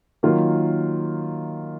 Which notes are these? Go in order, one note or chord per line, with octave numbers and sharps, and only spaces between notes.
D#3 F#3 A#3 F4